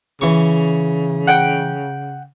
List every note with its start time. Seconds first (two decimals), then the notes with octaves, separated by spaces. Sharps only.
0.21 C#3 E3 C#6
1.27 F#5 G5